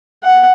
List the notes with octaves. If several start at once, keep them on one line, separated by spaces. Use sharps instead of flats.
F#5